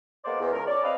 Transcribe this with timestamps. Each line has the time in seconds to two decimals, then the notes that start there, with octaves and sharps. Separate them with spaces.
0.25 G#3 A#3 B3 C5 D5
0.40 E2
0.53 C#2 A#4
0.67 C#4 C#5 D5
0.83 C4 B4 D#5 F5